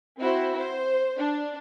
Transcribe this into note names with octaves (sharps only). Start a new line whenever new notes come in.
C4 E4 F#4 C5
C5
D4